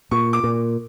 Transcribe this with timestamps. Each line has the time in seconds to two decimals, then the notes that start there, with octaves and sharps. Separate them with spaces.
0.11 A#2 C#6
0.33 D6
0.44 A#2